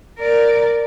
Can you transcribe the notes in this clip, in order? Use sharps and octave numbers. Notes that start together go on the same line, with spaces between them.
A#4 D5